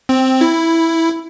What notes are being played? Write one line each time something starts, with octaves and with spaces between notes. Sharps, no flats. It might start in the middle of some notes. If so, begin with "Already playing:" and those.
C4
E4